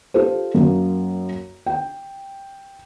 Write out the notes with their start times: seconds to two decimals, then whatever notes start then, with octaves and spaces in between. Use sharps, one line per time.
0.14 F4 G4 A4 C5
0.55 F#2 A#3
1.66 G5